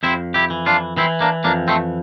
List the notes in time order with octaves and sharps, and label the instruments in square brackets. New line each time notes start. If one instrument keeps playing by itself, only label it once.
[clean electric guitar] F2 C4 E4
E4 G4
E3
D4 F4
E3 C4 E4
A#3 D4
F2 A#3 D4
A3 C4